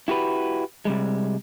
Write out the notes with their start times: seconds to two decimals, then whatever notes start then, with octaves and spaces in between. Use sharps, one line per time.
0.08 E4 F#4 G4 B4
0.85 C3 G3 G#3